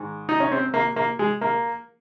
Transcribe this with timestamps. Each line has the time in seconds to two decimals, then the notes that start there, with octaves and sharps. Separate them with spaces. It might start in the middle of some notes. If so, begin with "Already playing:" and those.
Already playing: G#2 D#3
0.29 D#4
0.40 C#4
0.52 C4
0.74 A#3
0.96 A#3
1.19 G#3
1.41 A#3